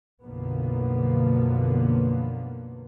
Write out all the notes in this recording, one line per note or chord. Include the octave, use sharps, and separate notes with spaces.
B1 F#2 D3 F3 A#3 B3